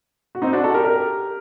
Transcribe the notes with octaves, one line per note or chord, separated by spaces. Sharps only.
F#4
C4 D#4
D4 F#4
F#4 A4
G4 A#4
G4 A#4